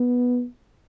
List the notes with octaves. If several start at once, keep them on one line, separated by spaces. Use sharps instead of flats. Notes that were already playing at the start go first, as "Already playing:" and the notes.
Already playing: B3